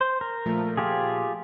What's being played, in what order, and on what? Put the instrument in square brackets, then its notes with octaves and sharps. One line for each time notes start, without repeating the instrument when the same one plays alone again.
[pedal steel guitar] C5
A#4
[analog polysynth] A#2 F3 A3
[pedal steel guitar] F4 G4 G#4